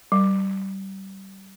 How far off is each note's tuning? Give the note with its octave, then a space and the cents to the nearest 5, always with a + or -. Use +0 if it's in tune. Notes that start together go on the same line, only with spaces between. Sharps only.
G3 -25